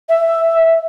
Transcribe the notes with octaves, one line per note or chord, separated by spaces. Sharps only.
E5